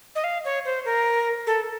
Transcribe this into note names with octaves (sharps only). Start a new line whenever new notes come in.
D#5
F5
C#5
C5
A#4
A4